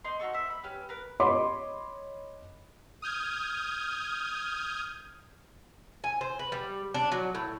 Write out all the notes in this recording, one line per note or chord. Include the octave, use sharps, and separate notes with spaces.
D#4 C6
D#4 F#4 A4 C#6
C5 E5
B5
C#4 G4 B4
A#4 B4
C#5 D#5 B5 C6 D6
D#6 F6 G6 G#6
G#5
C5
B4
G3
D4
F#3
A2